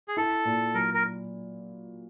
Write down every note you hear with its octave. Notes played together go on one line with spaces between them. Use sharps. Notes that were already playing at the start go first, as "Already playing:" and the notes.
G#4
E4 A4
A#2
F#3 A#4
A#4